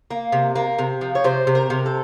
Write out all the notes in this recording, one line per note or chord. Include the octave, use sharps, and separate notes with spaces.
A#3
C3
A#3
C3
F3
C#5
C3 C5
C3
A#4
C3
A4